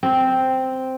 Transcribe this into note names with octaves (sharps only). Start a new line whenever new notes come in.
C4